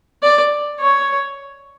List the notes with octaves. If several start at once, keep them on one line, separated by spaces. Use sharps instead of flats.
D5
C#5